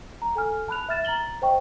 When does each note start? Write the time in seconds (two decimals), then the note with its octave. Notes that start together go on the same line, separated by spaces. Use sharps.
0.22 A#5
0.35 A4 G#5 F6
0.68 A5 B5 F#6 F7
0.89 E5 F6 A6 E7
1.05 A#5 A6 F#7 G7
1.42 C5 D#5 G5 C#6